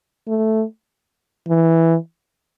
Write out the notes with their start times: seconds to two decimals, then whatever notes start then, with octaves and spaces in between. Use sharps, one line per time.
0.27 A3
1.48 E3